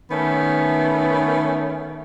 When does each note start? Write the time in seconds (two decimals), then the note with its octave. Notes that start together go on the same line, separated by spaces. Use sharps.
0.11 D#3 A3 B3 C#4